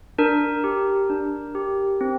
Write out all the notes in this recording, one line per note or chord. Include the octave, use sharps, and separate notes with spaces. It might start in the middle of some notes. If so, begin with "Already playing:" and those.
D4 A#4
G4
D4
G4
C4